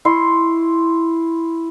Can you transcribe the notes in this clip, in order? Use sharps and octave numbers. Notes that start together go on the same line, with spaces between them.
E4 C6 C#6